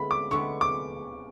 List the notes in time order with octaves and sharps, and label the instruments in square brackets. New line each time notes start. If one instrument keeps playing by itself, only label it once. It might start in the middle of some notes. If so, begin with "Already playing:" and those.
Already playing: [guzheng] D3 G#3 B3 E4 [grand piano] B5
[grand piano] D6
[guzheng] D3 G#3 B3 E4 [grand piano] C#6
[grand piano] D6